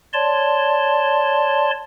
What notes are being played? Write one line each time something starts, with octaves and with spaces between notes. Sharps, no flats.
C#5 D5 A5 C6